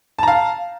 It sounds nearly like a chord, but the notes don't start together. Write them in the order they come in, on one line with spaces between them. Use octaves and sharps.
A5 A#5 F5